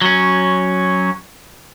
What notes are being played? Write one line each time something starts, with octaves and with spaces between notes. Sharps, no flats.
F#3 C#4